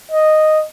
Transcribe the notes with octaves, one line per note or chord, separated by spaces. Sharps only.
D#5